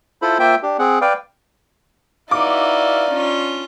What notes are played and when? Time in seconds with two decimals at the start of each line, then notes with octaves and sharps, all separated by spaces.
0.22 E4 F4 A4 C5 B5
0.39 A#3 F4 C5 E5 G5
0.63 D4 G4
0.79 C4 G#4 F#5
1.01 B4 D5 F5 G5
2.31 D#4 E4 F#4 B4 D5 F5 D6
3.10 C#4 D4 F4